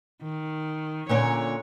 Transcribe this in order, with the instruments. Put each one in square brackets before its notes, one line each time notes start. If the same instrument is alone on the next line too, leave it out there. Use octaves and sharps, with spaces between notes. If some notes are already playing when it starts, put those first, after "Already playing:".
[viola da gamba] D#3
[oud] A#2 D3 C#4 [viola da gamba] C#5